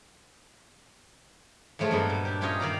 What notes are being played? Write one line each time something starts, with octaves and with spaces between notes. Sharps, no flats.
A2 F3 G#3 A3 F4 G#4
G2 F#3 A#3 B3 A4 F#5
A#2
D4 G4
C#4 E4 F4 G4 C#5 D#5
D#3 D5 F5 A#5